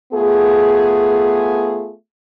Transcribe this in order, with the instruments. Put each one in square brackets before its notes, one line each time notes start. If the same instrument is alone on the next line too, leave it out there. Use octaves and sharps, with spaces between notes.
[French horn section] A3 B3 F4 G#4